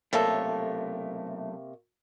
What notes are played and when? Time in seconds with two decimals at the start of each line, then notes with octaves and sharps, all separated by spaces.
0.13 B1 C3 G3 A3 A#3 A4 C#5